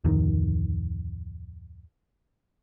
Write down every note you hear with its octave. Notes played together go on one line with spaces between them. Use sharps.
D1 F2 D#3